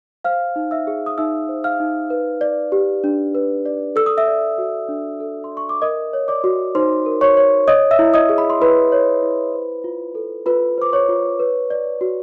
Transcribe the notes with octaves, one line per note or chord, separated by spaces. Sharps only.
C5 F5 F6
D#4
E5 E6
G#4
D#6
D#4 E5 E6
C5
F5 F6
D#4
B4
D5
G4
D4
B4
D5
A4 E6
D#6
E5 E6
D5
F#4
D4
A4
C6
D5
C#6
D6
A#4 D#5 D#6
C#5
D5 D6
F#4
D#4 C5 C6
A#4
C#5 C#6
C#5
C#5 D#5 D#6
E5 E6
E4
D#5 D#6
G#4
B5
C6
E4 B4 B5
C#5
E4
C5
F4
A4
F4 B4 B5
C5 D6
C#5 C#6
F4
B4
D5
F#4